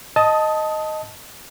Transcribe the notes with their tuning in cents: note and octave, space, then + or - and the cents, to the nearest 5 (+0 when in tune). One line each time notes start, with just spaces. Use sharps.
D#5 +0 A5 +0 D#6 +20